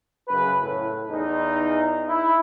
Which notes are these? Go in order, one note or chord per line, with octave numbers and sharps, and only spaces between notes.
F#2 C#3 B4
A2
E2 D#4
E4